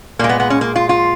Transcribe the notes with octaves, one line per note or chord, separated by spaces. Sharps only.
A#2 G#3 A#3
B3
B3
C#4
A#3
F4
F4